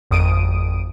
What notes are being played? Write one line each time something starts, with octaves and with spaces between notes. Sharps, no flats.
G#1 F2 D#6 D7 D#7